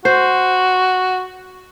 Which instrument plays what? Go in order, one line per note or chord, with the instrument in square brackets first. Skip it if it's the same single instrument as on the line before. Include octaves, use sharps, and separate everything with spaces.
[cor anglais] F#4 [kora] C5